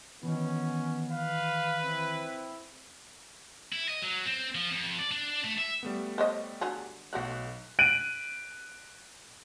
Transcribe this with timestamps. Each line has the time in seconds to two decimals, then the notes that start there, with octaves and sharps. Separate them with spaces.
0.23 D#3 E3 B3 C#4
1.11 B4 F5
1.85 C4 E4
3.72 E4
3.88 D#5
4.02 F#3
4.25 C4
4.55 F3
4.71 F2
4.99 D5
5.11 D4
5.44 A3
5.58 E5
5.83 G3 A3 B3
6.18 C5 C#5 D#5
6.61 D3 F#3 G#4
7.13 B1 F#3 A3 F#4 F#6
7.79 F#6 D7 D#7 F#7